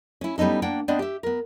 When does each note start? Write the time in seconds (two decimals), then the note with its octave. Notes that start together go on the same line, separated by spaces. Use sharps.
0.21 C#4 E4
0.38 G3 B3 C#4 D#4 A4
0.62 A#3 D4 F#5 G5
0.88 B3 C4 D4 D5 D#5
0.99 G4 E5
1.23 B3 A#4